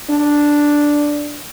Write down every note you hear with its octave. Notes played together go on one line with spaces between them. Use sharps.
D4